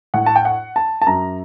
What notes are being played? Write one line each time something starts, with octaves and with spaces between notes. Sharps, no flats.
A2 F#5
A5
G5
F#5
A5
A5
F#2 A#5